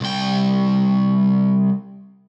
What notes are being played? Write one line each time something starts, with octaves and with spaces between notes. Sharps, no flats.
C2 G5